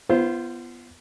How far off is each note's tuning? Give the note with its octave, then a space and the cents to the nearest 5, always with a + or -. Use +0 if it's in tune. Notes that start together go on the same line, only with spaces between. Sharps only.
B3 +0 F4 -35 C5 +0